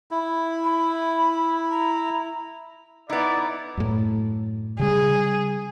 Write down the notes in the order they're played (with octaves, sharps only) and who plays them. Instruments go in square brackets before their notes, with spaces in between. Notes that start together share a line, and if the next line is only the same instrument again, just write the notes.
[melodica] E4
[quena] B5
A#5
[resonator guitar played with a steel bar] B3 D#4 [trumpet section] E4 D5
[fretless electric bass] F#2 A2
[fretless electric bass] C#3 G3 [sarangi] G#4